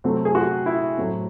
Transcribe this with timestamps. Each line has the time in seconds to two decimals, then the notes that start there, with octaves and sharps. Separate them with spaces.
0.04 C3 F#3 A3 C4
0.25 G#4
0.35 F#4
0.66 E4
0.98 A2 F#3 A3 C4